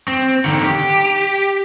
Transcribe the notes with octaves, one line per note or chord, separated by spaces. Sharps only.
C4
D3 D#3
G4